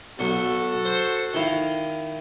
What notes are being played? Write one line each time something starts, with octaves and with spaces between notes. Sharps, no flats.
B1 F#4 A4
C5
D#3 E4 F5